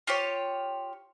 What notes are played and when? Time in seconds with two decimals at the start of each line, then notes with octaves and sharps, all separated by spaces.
0.07 F4 G4 C#5